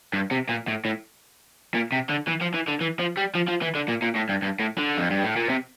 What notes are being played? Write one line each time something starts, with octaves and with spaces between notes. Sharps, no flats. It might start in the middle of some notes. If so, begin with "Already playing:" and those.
G2
C3
A#2
A2
A2
A#2
C3
D3
E3
F3
E3
D3
E3
F3
G3
F3
F3
E3
D3
A#2
A#2
A2
G2
G2
A2
D3
F2
G2
A2
A#2
C3